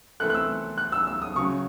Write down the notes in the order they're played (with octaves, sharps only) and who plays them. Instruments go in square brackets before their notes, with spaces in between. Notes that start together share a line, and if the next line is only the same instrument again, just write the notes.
[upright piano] E3 A3 C4 E4 A4 [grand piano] F#6
[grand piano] F#6
E6
F#6
E6
E6
D#6
[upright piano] C#3 F#3 C#4 [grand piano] C#6